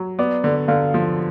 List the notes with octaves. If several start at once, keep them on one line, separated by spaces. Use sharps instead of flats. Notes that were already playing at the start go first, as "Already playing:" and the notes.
Already playing: F#3
B3 D5
D3
D3 F5
F3